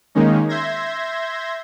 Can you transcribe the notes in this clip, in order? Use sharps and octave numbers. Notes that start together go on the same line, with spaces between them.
D#3 G#3 A#3 C#4 D#4
E5 C6 G6 G#6 A#6